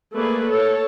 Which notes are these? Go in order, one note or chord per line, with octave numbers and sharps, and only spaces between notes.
A3 A#3 G#4 B4 D5
A4 C#5